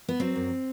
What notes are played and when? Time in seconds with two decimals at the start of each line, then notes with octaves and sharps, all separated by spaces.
0.09 B3
0.20 F#3 C4
0.36 F#2